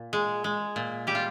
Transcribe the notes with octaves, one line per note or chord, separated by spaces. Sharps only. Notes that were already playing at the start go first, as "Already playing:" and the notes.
Already playing: A#2
G#3
G#3
A#2
G3 G4
F4